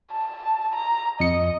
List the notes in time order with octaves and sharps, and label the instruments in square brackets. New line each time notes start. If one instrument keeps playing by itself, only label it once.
[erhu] A5
A#5
[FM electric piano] F2 C#7 [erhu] D#5